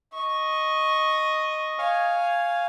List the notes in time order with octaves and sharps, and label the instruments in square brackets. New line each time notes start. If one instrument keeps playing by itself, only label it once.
[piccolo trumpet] D#5 [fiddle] C#6
[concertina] C#5 F5 G#5